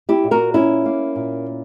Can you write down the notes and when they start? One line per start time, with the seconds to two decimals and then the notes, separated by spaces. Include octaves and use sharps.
0.09 E4 G4
0.24 A#2
0.31 F#4 A#4
0.54 A#3 C#4 E4
0.85 A#3
1.16 A#2